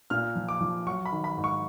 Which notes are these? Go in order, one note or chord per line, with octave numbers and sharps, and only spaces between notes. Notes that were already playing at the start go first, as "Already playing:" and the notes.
A#2 F6
F3
D6
F3
F#3 C#6
B5
D#3
B5
G#2
C#6